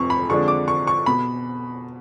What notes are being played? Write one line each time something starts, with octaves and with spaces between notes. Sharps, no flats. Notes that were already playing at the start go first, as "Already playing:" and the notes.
Already playing: F1 F2 F3 C#6
B5
F2 D3 F3 G#3 D4 C#6
D6
C#6
C#6
B2 B5